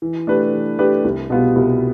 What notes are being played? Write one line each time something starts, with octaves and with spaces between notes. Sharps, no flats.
E3
A3 D4 G4 B4
E3
A3 D4 G4 B4
C2
B2 G3 B3 F4
C2